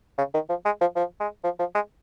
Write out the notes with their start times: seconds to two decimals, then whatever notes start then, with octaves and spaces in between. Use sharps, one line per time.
0.18 C#3
0.34 D#3
0.49 F3
0.65 G#3
0.81 F3
0.96 F3
1.20 G#3
1.44 F3
1.59 F3
1.75 G#3